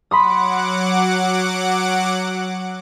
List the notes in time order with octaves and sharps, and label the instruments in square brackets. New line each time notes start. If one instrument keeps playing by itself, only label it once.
[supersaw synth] F#3 F#5 D6 [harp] B5 C6 D#6